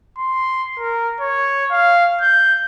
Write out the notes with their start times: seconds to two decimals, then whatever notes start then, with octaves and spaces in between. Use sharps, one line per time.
0.18 C6
0.79 A#4
1.21 C#5
1.71 F5
2.21 G6